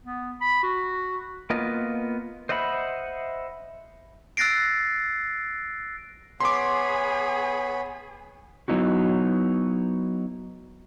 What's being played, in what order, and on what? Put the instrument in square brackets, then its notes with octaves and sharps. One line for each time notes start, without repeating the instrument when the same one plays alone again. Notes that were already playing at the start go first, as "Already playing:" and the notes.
[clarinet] B3
B5
F#4
[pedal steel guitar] A#3 B3 F4 D#5
C5 D#5 E5 F#5 B5
[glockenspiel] E6 F#6 A6 A#6 C7 D7
[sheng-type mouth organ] B3 C#5 B5 [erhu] G#4 [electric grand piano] C6 D6
[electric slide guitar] F#3 B3 D#4 E4 F#4